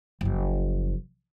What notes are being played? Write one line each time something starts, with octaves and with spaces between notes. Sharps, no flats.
F#1 F3